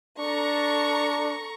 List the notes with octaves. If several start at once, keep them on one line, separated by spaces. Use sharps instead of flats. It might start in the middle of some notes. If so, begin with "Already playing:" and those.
D4 A4 A#5 C#6